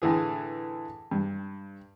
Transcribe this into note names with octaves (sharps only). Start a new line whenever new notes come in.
A2 D3 E3 G#4
G2